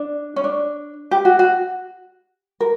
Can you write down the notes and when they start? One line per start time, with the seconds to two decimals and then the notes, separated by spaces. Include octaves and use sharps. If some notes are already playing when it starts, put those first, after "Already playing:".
Already playing: D4
0.36 C#4
0.44 D4
1.11 G4
1.25 F#4
1.39 F#4
2.60 A#4